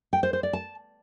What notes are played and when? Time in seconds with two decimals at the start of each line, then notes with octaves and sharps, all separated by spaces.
0.13 G5
0.23 C5
0.33 C5
0.43 D5
0.53 A5